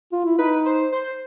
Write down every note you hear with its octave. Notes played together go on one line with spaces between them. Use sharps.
F4
E4
D#4 B4
C5
C5